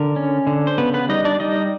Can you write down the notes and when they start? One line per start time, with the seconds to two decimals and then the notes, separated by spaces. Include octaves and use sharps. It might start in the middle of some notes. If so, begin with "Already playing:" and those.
Already playing: D3 A#4
0.16 C#4
0.47 D3
0.67 C5
0.78 C#3 B3 B4
0.94 B3 B4
1.09 G3 D#4 D#5
1.25 D4 D5
1.40 G3 D#4 D#5